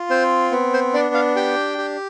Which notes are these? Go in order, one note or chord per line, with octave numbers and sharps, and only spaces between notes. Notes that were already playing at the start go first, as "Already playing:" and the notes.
Already playing: F4
C4 C5
B3
C5
D4 D5
F5
G4 G5
G4